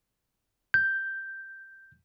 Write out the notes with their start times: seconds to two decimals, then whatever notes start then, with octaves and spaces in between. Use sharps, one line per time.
0.74 G6